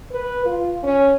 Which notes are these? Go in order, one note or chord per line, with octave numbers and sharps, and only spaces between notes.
B4
F4
C#4